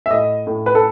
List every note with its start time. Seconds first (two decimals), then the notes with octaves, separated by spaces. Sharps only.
0.06 E5
0.10 A2 D#5
0.47 A2
0.66 B4
0.75 A4